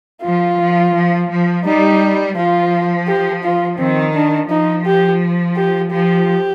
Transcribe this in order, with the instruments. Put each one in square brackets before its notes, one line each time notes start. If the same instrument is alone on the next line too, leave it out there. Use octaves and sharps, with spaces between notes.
[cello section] F3 [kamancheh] F4
[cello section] F3
F3
F3
[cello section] G3 [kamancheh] D#4
[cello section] F3 [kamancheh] F4
[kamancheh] G4
F4
[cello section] D#3 [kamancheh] C4
[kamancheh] D4
[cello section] F3 [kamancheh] D#4
[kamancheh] G4
G4
[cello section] F3 [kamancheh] G4